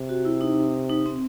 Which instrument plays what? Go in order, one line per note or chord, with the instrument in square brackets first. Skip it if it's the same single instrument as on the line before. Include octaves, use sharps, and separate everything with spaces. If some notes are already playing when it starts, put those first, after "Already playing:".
Already playing: [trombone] C3
[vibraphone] F#4
E4
D#4
D#4
C4